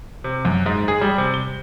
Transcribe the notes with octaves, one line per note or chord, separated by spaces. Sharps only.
C3
F#2
G#2
G#4
G3
C3
G7